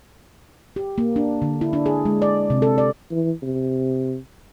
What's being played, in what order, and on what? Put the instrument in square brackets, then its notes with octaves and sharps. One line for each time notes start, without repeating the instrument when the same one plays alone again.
[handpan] G4
A#3
D4
D3
E4
D4
G#4
G#3
D5
C3
A4
D5
[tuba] E3
C3